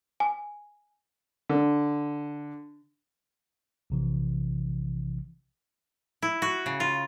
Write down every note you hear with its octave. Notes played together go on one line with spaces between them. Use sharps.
G#5
D3
A#1 C3 E3
E4
F#4
C#3
F4